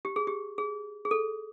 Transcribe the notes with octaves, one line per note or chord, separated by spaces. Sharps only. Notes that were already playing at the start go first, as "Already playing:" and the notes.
G4
G#4
G4
G#4
G#4
A4